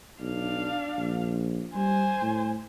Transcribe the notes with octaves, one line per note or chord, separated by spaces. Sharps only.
B1 D4 F5
A#1
G3 C5 G#5
A2